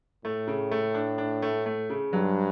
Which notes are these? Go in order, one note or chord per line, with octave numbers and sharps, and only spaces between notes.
A2 A3
C#3
A3
D4
D4
A3
A3
C#3
G2 F#3